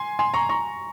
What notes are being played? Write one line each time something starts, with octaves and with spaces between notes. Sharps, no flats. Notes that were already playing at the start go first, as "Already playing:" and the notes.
Already playing: G#5 C6
G#5 C6
A#5 C#6
A#5 C#6